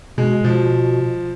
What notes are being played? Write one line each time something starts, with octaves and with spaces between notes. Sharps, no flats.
B2 G#3
B2 F3